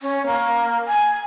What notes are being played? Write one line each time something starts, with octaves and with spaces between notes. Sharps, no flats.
C#4
A#3
G#5